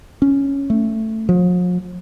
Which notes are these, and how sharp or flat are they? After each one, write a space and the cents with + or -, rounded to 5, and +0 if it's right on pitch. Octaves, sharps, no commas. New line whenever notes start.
C#4 +0
A3 +10
F3 +45